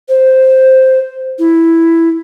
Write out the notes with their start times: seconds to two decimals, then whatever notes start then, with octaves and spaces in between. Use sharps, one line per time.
0.09 C5
1.39 E4